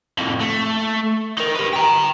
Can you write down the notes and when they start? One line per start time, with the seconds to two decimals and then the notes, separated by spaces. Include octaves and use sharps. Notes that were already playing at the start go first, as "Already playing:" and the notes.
0.18 F2 A2
0.40 A3
1.38 D#4 A#4
1.55 G4 B4
1.73 G5 A#5